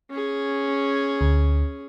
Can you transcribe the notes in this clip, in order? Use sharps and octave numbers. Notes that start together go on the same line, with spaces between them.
C#4 G#4
D2